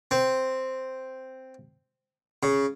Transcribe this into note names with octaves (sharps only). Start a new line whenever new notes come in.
C4
C#3